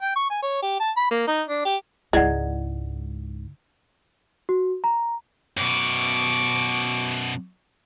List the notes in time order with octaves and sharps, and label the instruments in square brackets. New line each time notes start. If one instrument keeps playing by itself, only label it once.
[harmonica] G5
C#6
G#5
C#5
G4
A5
B5
A#3
D#4
D4
G4
[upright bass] C#2 G#2 [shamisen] G#3 [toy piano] E4 D5 F#5
[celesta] F#4
A#5
[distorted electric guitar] F#2 B2 [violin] C#6 D6